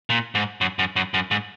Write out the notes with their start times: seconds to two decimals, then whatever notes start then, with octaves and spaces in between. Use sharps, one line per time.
0.10 A#2
0.35 G#2
0.61 F#2
0.79 F#2
0.96 F#2
1.14 F#2
1.31 G#2